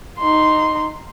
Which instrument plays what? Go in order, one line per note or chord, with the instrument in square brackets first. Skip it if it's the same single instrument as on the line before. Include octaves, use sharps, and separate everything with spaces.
[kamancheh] D#4 C6